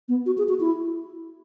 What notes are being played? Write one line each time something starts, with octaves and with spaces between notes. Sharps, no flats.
B3
F#4
G#4
F#4
E4